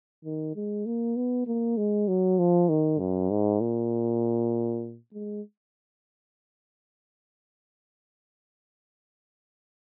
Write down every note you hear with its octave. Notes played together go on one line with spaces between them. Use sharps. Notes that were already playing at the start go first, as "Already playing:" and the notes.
D#3
G#3
A#3
B3
A#3
G#3
F#3
F3
D#3
F#2
G#2
A#2
G#3